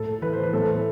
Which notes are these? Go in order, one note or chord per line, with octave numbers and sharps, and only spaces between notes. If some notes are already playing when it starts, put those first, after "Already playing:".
Already playing: A2 A4
E3 B4
C5
B4
A2 A4